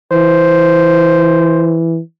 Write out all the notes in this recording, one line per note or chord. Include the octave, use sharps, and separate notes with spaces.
E3 C5